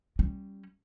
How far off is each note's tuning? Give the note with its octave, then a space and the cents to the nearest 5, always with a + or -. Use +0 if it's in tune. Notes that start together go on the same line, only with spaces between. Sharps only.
G3 +0 C#4 -15